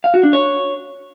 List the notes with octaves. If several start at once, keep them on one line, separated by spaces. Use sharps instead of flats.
F5
F#4
D4
C#5